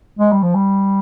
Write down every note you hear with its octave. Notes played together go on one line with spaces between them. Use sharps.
G#3
G3
F3
G3